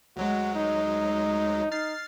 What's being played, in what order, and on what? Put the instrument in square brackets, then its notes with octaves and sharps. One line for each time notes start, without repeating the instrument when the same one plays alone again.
[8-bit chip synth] D2 F#3 G#3 [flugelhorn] F#4
[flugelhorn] D#4
[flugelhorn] D#4 [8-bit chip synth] F6 A6 C7